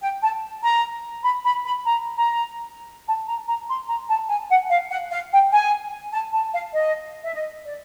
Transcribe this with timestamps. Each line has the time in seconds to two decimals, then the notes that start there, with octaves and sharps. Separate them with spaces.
0.02 G5
0.22 A5
0.63 A#5
1.24 B5
1.45 B5
1.65 B5
1.85 A#5
2.16 A#5
3.07 A5
3.27 A#5
3.47 A#5
3.68 C6
3.89 A#5
4.09 A5
4.29 G#5
4.50 F#5
4.70 F5
4.90 F#5
5.11 F5
5.32 G5
5.51 G#5
6.12 A5
6.33 A5
6.53 F5
6.73 D#5
7.24 E5
7.35 D#5
7.66 D5